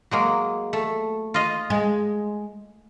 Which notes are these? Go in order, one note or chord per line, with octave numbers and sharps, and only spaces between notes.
F#3 G#3 A#3
A3
F4 D#5 F5
G#3